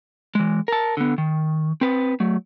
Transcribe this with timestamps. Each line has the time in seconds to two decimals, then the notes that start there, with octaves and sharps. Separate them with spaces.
0.35 E3 G#3
0.68 A#4 A5
0.97 D3 B3
1.18 D#3
1.81 C4 B4
2.20 F#3 A3